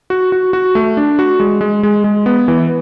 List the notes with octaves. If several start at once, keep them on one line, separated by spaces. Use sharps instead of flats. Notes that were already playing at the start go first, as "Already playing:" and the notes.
F#4
F#4
F#4
A3
D4
F#4
G#3
G#3
G#3
G#3
B3
E3